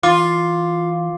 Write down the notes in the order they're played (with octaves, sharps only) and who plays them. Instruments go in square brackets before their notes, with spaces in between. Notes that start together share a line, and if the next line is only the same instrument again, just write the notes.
[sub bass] E3 [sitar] F4 [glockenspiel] D6